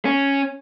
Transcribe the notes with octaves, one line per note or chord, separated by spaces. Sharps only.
C#4